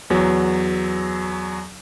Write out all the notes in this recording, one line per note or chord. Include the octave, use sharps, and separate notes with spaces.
E2 F#3